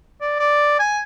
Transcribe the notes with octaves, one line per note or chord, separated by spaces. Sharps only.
D5
D5
G#5